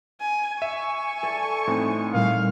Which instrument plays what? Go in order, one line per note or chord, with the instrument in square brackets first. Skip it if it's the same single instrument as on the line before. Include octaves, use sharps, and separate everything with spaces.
[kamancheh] G#5
[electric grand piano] E5 [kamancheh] G#5 C#6
[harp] A4 D5
[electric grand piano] A2 [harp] C4 D#4
[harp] A#2 G3 [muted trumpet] F5